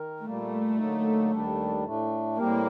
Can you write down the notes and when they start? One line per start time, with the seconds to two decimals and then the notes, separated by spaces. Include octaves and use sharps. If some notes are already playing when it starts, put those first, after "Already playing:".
Already playing: D#3 A#4
0.25 A#2 G3 A3 A#3
0.78 D3 F#3 A#3 D#4
1.32 D#2 D#3 G3 D4
1.84 A2 A3 D4
2.38 A2 G3 A#3 C4 G4 A#4